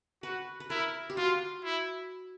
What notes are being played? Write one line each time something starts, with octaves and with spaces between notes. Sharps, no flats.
F#4 B4
B4
E4 A#4
G4
F4 F#4
E4